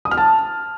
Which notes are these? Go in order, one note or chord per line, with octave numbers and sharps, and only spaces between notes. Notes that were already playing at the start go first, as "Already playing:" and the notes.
D#6
F6
A5